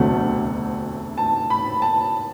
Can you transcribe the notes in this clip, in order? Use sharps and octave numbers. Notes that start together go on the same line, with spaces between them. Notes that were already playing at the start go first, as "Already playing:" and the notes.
Already playing: E1 D2 C3 F#3 A3 F#5
A5
B5
A5